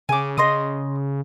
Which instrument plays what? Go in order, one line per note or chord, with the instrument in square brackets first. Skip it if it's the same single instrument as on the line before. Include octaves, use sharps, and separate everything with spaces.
[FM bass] C#3 [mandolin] G#5 D6
[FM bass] C#3 [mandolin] D#5 C6 D#6